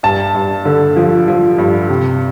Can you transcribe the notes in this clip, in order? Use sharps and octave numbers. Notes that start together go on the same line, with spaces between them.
G2 A5
G2
D3
F3
F3
G2
C3